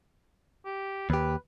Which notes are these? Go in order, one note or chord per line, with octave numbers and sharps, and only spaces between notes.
G4
D#2 G4 B4